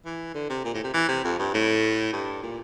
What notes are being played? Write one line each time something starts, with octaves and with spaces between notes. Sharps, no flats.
E3
D3
C3
A#2
A2
C3
E3
C3
F2
G2
A2
G2
A#2